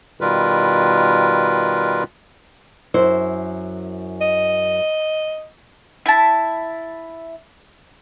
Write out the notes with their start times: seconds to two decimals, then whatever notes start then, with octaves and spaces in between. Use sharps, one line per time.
0.21 B2 D#3 G3 F4 A#4 B4
2.94 F#2 E4 C5
4.22 D#5
6.06 E4 A5